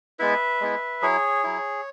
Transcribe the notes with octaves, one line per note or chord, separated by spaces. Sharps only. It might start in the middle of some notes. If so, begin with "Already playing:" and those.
G#3 B3 E4 B4 E5
G#3 B3 E4
F#3 E4 G#4 C#5
F#3 E4